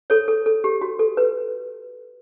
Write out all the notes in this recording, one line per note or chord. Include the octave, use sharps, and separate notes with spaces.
A4 C#5
A4
A4
G4
F#4
A4
B4